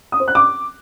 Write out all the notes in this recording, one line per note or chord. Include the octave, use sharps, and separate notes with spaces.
D#6
C5
F#6
D6